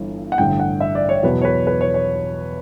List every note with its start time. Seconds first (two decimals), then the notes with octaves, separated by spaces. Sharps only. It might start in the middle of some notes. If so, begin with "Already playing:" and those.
Already playing: G1 G2 E3
0.32 F#5
0.38 A1 G2 D3 G5
0.60 F#5
0.81 E5
0.95 D5
1.09 C#5
1.23 E2 B2 F#3 B4
1.42 C#5
1.45 B4
1.67 B4
1.81 C#5
1.94 C#5